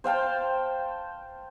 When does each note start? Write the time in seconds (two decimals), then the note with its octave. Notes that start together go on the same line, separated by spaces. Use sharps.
0.04 C5 F5 G5 A5